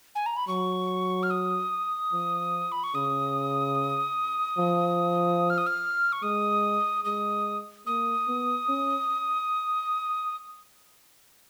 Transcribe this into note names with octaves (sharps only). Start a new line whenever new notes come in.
G#5
A#5
B5
F#3 C#6
F6
D#6
F3
B5
C#6
C#3 D#6
F3
F6
D#6
F6
C#6
G#3 D#6
G#3 D#6
A#3 D#6
B3
C#4